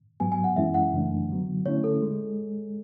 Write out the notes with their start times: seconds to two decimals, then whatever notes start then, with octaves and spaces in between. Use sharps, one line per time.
0.20 G#2 F#3 B3 G#5
0.32 G#5
0.44 F#5
0.56 F#2 E3 G#3 C#4 E4 E5
0.74 F#5
0.93 F#2 C#3 E3 A3 D4
1.29 D3 F#3 B3
1.66 D3 A3 C#4 E4 C#5
1.84 A4
2.02 G#3